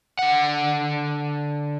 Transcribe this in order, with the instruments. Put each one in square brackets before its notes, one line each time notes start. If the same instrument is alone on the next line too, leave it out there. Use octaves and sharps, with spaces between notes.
[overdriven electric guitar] D3 F#5